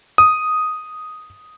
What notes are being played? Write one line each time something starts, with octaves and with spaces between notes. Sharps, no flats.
D#6